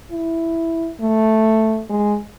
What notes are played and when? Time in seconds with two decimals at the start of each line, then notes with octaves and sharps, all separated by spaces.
0.11 E4
1.01 A3
1.90 G#3